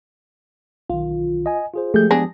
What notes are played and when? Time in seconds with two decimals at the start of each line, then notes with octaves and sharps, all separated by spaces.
0.90 B1 D#3 F4
1.46 D#5 G#5
1.74 F4 G#4 C5
1.94 F3 G#3 A3 G4 G#4 G6
2.11 B3 D4 G#4 A#6